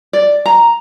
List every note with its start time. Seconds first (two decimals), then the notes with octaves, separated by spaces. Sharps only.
0.13 D5
0.46 A#5